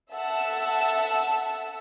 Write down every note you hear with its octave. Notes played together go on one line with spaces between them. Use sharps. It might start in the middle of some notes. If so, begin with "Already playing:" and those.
A4 E5 F#5 A5 E6